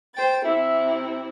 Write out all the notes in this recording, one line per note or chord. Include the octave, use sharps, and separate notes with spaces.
C5 G5 A6
C3 E4 E5